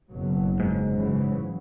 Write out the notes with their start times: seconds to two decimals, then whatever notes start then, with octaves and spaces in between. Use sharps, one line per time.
0.12 F#1 B2 F#3
0.60 G#2
0.95 C#3 E3 F#3